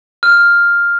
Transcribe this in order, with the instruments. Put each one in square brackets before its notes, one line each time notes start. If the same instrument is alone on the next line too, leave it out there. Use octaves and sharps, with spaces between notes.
[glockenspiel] F6